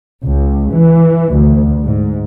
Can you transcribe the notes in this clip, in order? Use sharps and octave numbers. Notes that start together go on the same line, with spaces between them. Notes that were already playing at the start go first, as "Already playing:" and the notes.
C#2
E3
D2
G#2